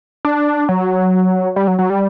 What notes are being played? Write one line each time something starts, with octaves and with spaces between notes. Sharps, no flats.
D4
F#3
G3
F#3
F#3
G3